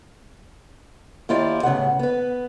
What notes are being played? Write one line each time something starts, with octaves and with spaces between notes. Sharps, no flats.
D#2 E4 F4 G4 D5
A2 C#3 B3 F#5
B3 B4